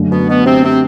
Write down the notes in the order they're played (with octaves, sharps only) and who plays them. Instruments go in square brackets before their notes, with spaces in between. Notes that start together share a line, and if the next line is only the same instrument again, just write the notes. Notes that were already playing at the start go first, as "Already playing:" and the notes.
Already playing: [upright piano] F#2 D3 A3
[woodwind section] B2 B3
B2 B3
C3 C4
C3 C4